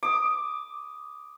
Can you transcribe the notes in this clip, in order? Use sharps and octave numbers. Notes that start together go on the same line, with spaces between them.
D6 D#6